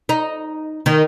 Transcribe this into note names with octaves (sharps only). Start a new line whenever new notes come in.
D#4
D#3